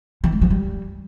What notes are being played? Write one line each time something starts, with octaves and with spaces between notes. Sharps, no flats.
E3
G#3
F3
G3